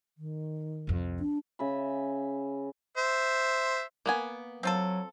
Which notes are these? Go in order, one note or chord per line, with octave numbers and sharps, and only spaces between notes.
D#3
C2 F2
D4
C#3 E5 B5
C5 E5
A#3 B3 G#5
F#3 C4 F4 A4